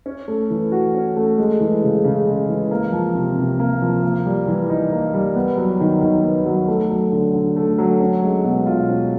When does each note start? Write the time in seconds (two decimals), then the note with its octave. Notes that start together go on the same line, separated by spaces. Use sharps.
0.06 C#4
0.28 A3
0.50 E3
0.72 F#4
0.95 C#4
1.16 A3
1.38 G#3
1.60 E3
1.83 C#3
2.04 C#3
2.26 G#3
2.49 E3
2.71 A#3
2.92 F3
3.14 C3
3.38 C3
3.59 A#3
3.82 F3
4.03 A#3
4.26 G3
4.47 E3
4.69 D#4
4.92 A#3
5.14 G3
5.35 B3
5.57 F#3
5.80 D#3
6.01 D#3
6.24 B3
6.46 F#3
6.68 A3
6.90 F#3
7.12 D3
7.34 D3
7.56 A3
7.78 F#3
8.00 C#4
8.23 G#3
8.44 B2
8.66 F4
8.89 C#4